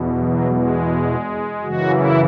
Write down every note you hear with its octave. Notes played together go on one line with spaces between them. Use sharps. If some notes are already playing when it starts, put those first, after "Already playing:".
Already playing: E2 B2
F#3
G#3
F#2 C#3 E3 F#4
E4